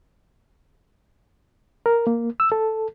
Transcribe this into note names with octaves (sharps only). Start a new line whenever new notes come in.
A#4
A#3
E6
A4